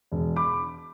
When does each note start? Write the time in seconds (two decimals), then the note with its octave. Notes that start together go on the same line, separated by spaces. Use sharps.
0.12 E1
0.36 B5 D6